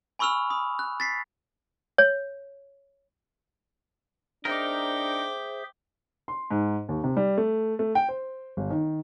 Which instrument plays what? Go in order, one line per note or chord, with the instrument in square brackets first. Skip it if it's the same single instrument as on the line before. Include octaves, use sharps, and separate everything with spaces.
[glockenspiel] G#5 B5 C#6 E6 F6 F7
B5 D#6
F#6
A6 B6 C7
[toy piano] C#5
[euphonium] D4 [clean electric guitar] D#4 A#4 [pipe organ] G#4 C5 E5 [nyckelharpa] G5 D6
[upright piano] C6
G#2
D#2
C3
G3
A3
A3
G5
C5
G1
D#3